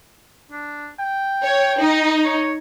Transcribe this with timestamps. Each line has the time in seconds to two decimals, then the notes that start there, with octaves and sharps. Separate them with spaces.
0.52 D4
0.99 G5
1.43 C#5
1.80 D#4
2.25 C#5